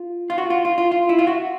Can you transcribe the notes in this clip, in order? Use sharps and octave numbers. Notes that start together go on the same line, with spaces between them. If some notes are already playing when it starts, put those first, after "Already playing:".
Already playing: F4
F4
F#4
F4
F4
F4
F4
E4
F4
F#4